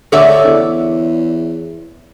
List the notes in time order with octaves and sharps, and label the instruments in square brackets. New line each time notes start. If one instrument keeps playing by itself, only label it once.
[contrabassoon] D3 [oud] C#5 D5 E5
[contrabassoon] E2